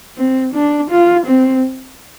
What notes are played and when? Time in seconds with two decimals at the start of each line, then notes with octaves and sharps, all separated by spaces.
0.17 C4
0.54 D4
0.91 F4
1.27 C4